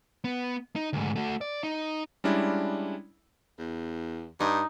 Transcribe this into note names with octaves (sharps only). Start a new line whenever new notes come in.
B3
D#4
D2 G#2
A3 F#4
D5
D#4
G3 G#3 C#4 D4 E4
E2
G2 D#4